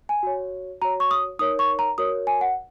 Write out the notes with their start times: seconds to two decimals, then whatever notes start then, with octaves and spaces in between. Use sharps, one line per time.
0.09 G#5
0.23 F#4 C#5
0.81 F#4 C#5 A#5
1.00 C#6
1.11 D#6
1.39 D#4 A#4 C#5 D#6
1.59 C#6
1.79 A#5
1.98 F#4 A#4 C#5 D#6
2.27 G#5
2.41 F#5